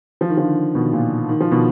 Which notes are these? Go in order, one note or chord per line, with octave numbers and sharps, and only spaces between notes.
F3
D#3
D3 F3
B2 D#3
A#2
D#3
F3
B2 D#3